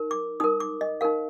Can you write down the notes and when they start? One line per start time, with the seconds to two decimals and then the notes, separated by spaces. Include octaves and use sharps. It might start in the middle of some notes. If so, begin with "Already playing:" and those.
Already playing: D#4 A#4
0.11 D6
0.40 D#4 A#4 D#6
0.60 D6
0.81 D#5
1.01 D#4 A#4 F5